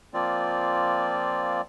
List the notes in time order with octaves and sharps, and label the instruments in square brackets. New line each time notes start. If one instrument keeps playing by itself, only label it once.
[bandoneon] F3 A#3 C4 F4 D5